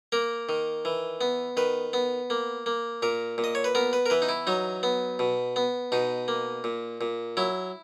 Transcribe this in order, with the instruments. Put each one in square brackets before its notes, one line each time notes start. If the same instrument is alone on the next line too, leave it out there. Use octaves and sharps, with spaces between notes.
[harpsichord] A#3 A#4
D#3
E3
B3
D#3 B4
B3
A#3
A#3
A#2 A#4
A#2
D#5
C#5
B4
B3 A#4
B4
A#4
E3 B4
D#4
E4
F#3 D#4
B3
B2
B3
B2 D#4
A#3
A#2
A#2
F#3 E4